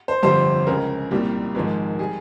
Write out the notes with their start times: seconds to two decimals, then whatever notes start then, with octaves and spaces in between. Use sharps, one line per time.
0.08 C5
0.23 G1 F2 C3 G3 C5
0.67 C#2 C#3 G#3 A#4
1.11 C2 A#2 G3
1.55 G#1 G#2 F3 G#3
1.99 G3 G#4